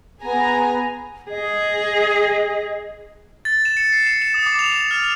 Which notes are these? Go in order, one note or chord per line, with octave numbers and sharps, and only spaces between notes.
B3 G#4 G#5 A#5
G#4 D#5
A6
E7
C#7
C7
E7
E7
D#6
D6
F7
E7
F6